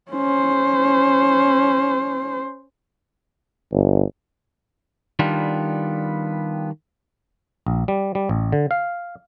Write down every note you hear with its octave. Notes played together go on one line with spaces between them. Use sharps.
C#4 C5
G1
D#3 G3 B3 D4 F4
A#1
G3
G3
A1
D3
F5